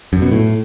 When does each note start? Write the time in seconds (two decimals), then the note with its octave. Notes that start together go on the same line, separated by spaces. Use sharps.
0.13 F#2
0.22 B2
0.32 A2